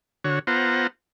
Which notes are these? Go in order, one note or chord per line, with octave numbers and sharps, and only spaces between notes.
D3 F#4 C#5
B3 F4 C5 F#5 A#5